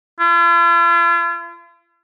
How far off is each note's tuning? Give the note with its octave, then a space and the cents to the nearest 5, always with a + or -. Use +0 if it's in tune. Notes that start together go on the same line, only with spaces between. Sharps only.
F4 -45